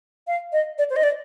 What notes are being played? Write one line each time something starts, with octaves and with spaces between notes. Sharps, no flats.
F5
D#5
D5
C5
D#5
D5